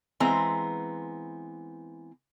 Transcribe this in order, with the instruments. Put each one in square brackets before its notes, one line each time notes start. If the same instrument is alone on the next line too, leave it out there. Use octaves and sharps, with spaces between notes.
[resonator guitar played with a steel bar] E3 G#3 B3 C4 A#5